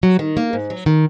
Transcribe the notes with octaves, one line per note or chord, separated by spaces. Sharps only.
F#3
D#3
A#3
G#2
F#3
D#3